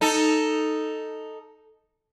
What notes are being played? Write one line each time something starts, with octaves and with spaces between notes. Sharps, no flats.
D#4 A4